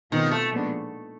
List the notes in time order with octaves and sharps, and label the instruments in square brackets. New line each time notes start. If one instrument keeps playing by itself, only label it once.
[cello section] B2 G#3 C4 F4 [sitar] D#3
[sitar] A3
[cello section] A#2 F3 G#3 B3 D4